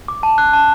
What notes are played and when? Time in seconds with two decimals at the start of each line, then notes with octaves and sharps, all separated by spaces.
0.08 D6
0.23 A5
0.38 F#6
0.53 A5